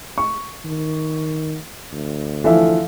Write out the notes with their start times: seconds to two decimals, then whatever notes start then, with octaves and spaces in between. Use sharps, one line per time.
0.18 C#6
0.65 D#3
1.93 D2
2.44 E3 F3 A4 E5 F5